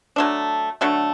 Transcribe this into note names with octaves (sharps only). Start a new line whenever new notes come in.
F#3 A3 D4
D3 F#3 A3